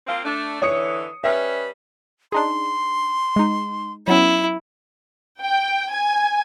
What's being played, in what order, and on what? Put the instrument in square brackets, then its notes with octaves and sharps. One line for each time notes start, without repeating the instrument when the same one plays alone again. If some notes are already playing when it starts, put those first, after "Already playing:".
[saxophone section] A#3 C4 F4
A3 D4
[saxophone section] D3 E3 [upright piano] C#5 D#6 C#7
[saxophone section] G3 C#4 B4 [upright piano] E5
[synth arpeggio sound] D4 D#4 G#4 [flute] C6
[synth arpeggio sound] G#3 D#4
[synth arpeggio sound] F#3 B3 C#4 [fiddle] E4
[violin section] G5
G#5